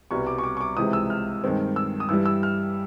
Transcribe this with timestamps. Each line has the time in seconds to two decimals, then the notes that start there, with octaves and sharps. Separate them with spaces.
0.11 C2 B2 G3 B3 C#6
0.27 D6
0.38 C#6
0.43 D6
0.57 C#6
0.61 D6
0.76 C#2 C3 E3 G#3 D#6
0.93 E6
1.10 F6
1.44 G2 D#3 G#3 C4
1.76 E6
2.00 D#6
2.09 G2 E3 G3 E6
2.26 E6
2.43 F6